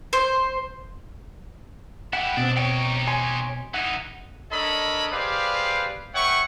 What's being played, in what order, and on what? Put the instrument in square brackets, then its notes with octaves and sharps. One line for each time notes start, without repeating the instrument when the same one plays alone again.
[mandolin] C5
[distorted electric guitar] E4 G4 [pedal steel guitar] F#5 G5
[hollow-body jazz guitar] B2 C4 [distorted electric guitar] D4
[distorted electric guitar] D#4 G4 [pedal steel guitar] C#5 G5
[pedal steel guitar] C#5 G#5 C6
[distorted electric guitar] E3 D#4 [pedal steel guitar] F#5
[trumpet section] D4 A4 A#4 C#5 D#5 B5
G4 G#4 B4 C5 D5 F5
B4 C#5 E5 F#5 G5 C#6